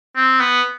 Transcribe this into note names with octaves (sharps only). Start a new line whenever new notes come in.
C4
B3